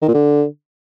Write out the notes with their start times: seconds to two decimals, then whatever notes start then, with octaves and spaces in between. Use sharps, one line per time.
0.02 D#3
0.08 A#2
0.14 D3